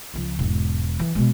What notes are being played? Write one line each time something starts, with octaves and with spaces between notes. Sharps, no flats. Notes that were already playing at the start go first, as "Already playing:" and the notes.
C#2 F3
E1 G#2
E3
B2 G#3